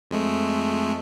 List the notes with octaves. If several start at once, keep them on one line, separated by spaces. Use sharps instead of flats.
F2 G#3 A3